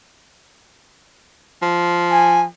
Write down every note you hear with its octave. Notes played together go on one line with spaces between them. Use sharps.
F3
G#5